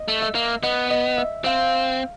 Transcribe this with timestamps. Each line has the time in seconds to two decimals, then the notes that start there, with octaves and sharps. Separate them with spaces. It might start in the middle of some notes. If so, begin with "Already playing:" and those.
Already playing: D#5
0.08 A3
0.22 E5
0.35 A#3
0.63 B3 D#5
0.90 D#5
1.18 E5
1.44 C4 F5